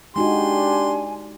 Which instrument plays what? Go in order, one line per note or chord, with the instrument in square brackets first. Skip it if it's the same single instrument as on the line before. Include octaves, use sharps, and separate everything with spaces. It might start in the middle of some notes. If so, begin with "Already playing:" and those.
[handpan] G#3 D#4 F#4 [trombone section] D4 G4 [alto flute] G#5 [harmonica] C6